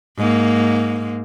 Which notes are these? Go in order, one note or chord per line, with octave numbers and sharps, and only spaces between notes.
G#2 A#3